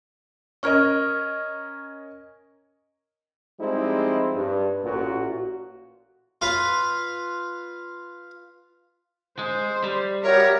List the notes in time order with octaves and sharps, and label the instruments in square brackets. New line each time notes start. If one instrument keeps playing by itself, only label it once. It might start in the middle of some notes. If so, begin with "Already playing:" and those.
[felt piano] C#4 A#4 D#5 [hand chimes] C#6 F6 G#6
[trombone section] F3 G3 G#3 C4 D#4 E4
G2
A1 A#2 F#4
[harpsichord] F4 B4
[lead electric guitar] G#3 [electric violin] C5
[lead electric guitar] G3
[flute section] F#4 G4 E5 [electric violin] A#4 A#6 [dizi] C#5